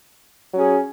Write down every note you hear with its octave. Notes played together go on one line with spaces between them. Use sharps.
F#3 C#4 G#4